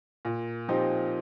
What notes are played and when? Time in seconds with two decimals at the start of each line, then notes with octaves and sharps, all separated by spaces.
0.25 A#2
0.69 F3 C4 D#4 G4